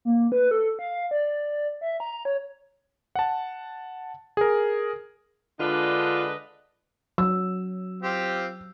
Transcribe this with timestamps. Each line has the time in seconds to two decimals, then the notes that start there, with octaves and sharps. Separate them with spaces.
0.05 A#3
0.32 B4
0.51 A4
0.79 F5
1.11 D5
1.81 E5
2.00 A#5
2.25 C#5
3.15 F#5 A5
4.37 G#4 A#4
5.60 D3 G#3 D4 F4 B4 D#5
7.18 F#3 E6
8.02 C4 F4 G4